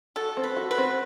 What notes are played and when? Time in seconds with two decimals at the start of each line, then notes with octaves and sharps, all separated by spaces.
0.16 F#4 A4
0.37 C4
0.44 B4
0.56 F#4
0.71 B4
0.78 C4